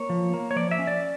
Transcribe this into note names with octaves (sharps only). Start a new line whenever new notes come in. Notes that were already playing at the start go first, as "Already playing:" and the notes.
Already playing: A#3 C#5
F3
A#3
C#5
F3 D5
E5
C#4
D5